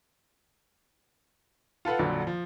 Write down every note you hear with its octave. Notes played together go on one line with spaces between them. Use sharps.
F4 A4 B4 F#5
A#1 F2 D3 F#3
F3